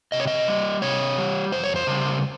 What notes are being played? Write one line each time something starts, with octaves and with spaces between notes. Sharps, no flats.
C3 D#5
C#5
D#5
G3
C3 C#5
G3
F2 C5
C#5
C5
C#3 G3